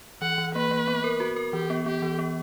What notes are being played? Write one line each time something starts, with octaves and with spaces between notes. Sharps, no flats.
E3 F#5
E3
A#3 B4
A#3
B3
A#4
F#4
A#4
E3 G4
B3
B3 G4
E3
B3